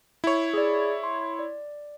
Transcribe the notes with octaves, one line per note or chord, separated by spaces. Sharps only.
E4 C#5
G#4 D5
C6
D5